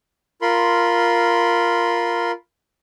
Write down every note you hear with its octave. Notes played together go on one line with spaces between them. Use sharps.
F4 A#4 B5 C6